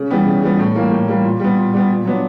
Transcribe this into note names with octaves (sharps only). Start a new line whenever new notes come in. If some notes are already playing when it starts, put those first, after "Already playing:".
Already playing: C#3
E3 G3 B3
C#3
E3 G3 B3
A2
E3 G3 A#3
A2
E3 G3 A#3
A#2
G3 B3
A#2
G3 B3
A#2
F#3 B3 D4